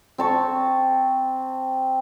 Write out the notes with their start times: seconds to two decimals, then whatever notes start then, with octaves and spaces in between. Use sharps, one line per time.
0.18 C4 A5 C#6